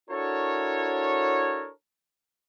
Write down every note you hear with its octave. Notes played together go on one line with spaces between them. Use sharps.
D4 E4 F#4 A4 A#4 C#5